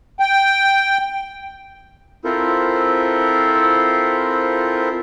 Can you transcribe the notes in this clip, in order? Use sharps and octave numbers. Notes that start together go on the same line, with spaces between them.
G5
C4 E4 F4 A4 A#4 C5